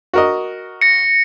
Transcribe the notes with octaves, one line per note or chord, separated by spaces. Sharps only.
F#4 A#4 D#5
A#6 C#7